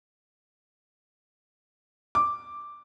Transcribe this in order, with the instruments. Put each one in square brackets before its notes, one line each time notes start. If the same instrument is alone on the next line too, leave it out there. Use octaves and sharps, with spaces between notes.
[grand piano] D6